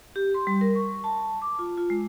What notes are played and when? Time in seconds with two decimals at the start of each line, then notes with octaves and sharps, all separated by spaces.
0.16 G4
0.34 C6
0.47 G3
0.61 A#4
0.75 C#6
1.04 A5
1.20 A5
1.42 D6
1.59 F4
1.77 F4
1.90 G#3